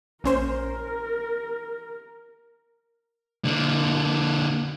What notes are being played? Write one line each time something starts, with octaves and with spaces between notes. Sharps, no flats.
A#1 C#4 A#4 C5
D3 A#3